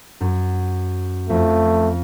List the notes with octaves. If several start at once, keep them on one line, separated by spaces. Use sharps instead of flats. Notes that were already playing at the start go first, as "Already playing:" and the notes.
F#2 A6
F2 A3